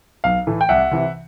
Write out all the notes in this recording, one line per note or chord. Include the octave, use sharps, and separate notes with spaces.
B1 F5
A2 E3 A3
G5
C2 E5 F#5
C3 E3